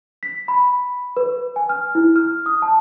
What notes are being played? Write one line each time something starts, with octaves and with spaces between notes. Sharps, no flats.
B6
B5
B4
G#5
F6
E4
F6
D#6
A5